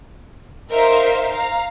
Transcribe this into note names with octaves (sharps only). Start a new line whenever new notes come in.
D#4 A#4 C5 E5 F5
F5 A#5